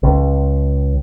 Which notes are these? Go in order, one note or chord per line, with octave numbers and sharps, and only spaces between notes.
C#2